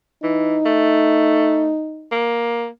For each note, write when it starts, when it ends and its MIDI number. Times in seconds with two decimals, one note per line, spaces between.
0.23 0.58 52
0.23 2.13 63
0.65 1.75 57
2.12 2.67 58